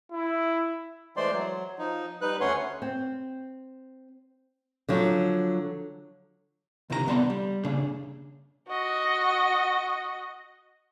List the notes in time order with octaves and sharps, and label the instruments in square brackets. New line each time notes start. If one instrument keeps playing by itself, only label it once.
[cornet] E4
[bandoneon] E3 G#3 A3 C5 D5 C6
F#3
F3 D#4
G3 D#4 B4 F#6
D2 A3 C#4 C#5 F#5 C6
[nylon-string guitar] C4
D3 F3 F#3
[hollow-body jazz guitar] C#2 C3 D#3 E3 A4 A#5
C2 D3 B3 D5 A5 C6
G3
C#3 A#3 D4 G#4
[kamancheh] F#4 D#5